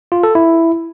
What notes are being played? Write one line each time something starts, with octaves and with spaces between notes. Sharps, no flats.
F4
A4
E4